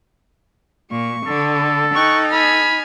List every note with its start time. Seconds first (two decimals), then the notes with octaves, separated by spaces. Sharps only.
0.91 A#2 C#6
1.27 D3 A4
1.95 D#4 G5 C#6 F#6
2.31 G#5 B5 F6